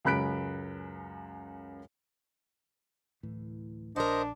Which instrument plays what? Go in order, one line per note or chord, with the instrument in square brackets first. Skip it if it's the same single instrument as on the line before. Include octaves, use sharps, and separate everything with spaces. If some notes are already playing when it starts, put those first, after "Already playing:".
[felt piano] C#2 F#2 B5 F#6 B6 D7
[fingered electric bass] D1 A2 E3
[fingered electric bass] A#1 [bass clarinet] D4 [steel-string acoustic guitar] A#4 F#5 [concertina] C5 D#5